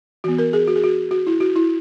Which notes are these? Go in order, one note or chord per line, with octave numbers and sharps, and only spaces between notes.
E3 B3 F#4
A#4
G#4
F#4
G#4
F#4
F#4
E4
F#4
E4